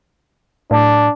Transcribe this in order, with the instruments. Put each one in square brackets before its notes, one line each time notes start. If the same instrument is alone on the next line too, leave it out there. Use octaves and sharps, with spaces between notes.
[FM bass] A2 [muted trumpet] D4